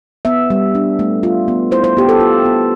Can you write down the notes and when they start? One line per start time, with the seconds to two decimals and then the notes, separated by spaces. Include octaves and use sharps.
0.25 B3 E5
0.50 G3
0.75 D4
0.99 A3
1.23 F4
1.48 B3
1.71 E4 C5
1.84 C5
1.97 B3 G4
2.09 A4
2.20 F4
2.45 B3